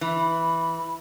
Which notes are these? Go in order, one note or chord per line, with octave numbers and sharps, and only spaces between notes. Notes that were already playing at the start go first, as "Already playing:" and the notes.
E3 B5